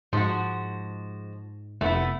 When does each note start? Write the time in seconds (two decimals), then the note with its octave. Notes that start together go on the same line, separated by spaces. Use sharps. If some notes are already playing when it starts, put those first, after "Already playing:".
0.13 G#2 F3 G#3 F#4
1.81 F1 A3 B3 E4